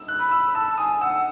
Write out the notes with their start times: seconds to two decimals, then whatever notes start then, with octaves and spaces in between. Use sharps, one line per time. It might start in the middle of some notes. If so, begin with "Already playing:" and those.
Already playing: E6
0.08 F#6
0.19 B5
0.31 E6
0.55 A5 E6
0.77 G#5 D#6
1.01 F#5 E6